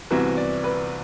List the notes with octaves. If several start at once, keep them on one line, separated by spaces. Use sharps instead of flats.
C2 C3 E3 B3 F#4
D5
B4